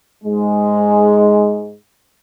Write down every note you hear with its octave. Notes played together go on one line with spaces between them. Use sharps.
G#2 G#3